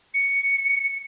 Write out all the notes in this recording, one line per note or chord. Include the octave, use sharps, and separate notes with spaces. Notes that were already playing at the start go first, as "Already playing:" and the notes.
C#7